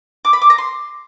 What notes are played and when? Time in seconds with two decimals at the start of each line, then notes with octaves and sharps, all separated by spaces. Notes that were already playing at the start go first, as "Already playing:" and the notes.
0.25 D6
0.33 B5
0.41 D6
0.50 A#5
0.58 C6